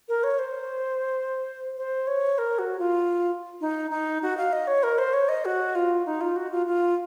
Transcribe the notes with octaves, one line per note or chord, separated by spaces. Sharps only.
A#4
C#5
C5
C5
C#5
A#4
F#4
F4
D#4
D#4
F#4
F5
D#5
C#5
A#4
C5
C#5
D#5
F#4
F4
D#4
F4
F#4
F4
F4